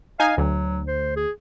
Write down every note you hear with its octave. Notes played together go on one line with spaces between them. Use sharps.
D#4 F5 G#5
D2 F#3
C5
G#4